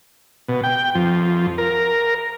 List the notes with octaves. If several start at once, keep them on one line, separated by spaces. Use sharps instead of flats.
B2
G5
F2
A#4